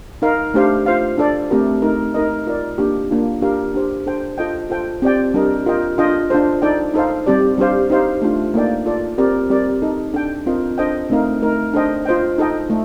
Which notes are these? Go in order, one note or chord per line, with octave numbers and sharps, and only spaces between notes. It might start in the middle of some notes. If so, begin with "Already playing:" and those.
D#4 A#4 F5
A3 D4 G4 C5 F5
F4 C5 F5
D4 A4 D5
A3 C4 G4 A#4
A3 D#4 A#4
D#4 A#4 D#5
F4 A#4 D5
A#3 D4 G4
A#3 D4 F4
D4 G4 A#4 F5
D4 G4 C5
D4 A4 C5 G5
F4 A4 D#5 G5
F4 A4 C5 G5
C4 G4 D5 G5
G3 D4 G4 A#4 D#5
F4 A#4 D#5 G5
D4 F4 A4 D#5 G5
D4 F4 A4 C5
D#4 A4 D5 G5
D#4 A4 C5 F5
G3 C4 G4 D5
G3 D4 G4 C5 F5
D#4 G4 C5 F5
A3 D4 F4
A#3 D#4 A4 D5 G5
F4 A4 D5
C4 G4 A#4 D5
G3 C4 G4 A#4 D5
D#4 A4 D#5
D4 A4 D5 G5
C4 F4 A#4 D#5
D4 A4 C5 D#5 G5
A3 C4 D#4 A#4 F5
A3 D#4 A#4
D4 A4 C5 D#5 G5
F4 C5 D#5 G5
D#4 A4 D#5 G5
A3